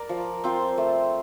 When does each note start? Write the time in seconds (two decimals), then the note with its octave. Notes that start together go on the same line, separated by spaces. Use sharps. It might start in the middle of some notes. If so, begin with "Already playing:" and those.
Already playing: A#4 D5
0.09 F3
0.44 C4 F4 C5
0.78 A3